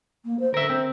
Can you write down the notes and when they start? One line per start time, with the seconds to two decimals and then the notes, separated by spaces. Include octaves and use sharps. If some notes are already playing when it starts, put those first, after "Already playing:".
0.25 A#3
0.39 C5
0.54 D3 A#4 E5
0.70 C4